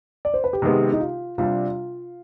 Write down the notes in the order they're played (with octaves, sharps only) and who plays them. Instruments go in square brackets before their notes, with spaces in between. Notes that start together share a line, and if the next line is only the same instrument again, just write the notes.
[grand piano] D5
C5
B4
G4
[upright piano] C3 D#3 G#3 B3
[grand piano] D#4
F4
[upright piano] C3 G3 D4 [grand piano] F4